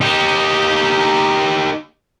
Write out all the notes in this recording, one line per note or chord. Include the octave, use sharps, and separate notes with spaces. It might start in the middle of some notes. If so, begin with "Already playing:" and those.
D#4 G4